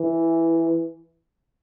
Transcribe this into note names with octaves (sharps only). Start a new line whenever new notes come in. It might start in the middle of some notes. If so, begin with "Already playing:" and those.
Already playing: E3